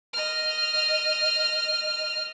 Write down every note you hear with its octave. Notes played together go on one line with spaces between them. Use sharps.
D#5 F6